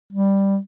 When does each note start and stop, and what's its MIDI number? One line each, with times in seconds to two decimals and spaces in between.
0.13 0.58 55